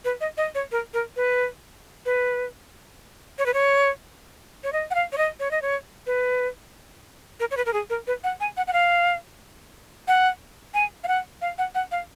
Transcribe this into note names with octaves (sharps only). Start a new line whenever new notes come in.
B4
D#5
D#5
C#5
A#4
A#4
B4
B4
C#5
B4
C#5
C#5
D#5
F#5
F5
C#5
D#5
C#5
D#5
C#5
B4
A#4
C#5
B4
A#4
G#4
A#4
B4
F#5
G#5
F#5
F#5
F5
F#5
G#5
F5
F#5
F5
F#5
F#5
F5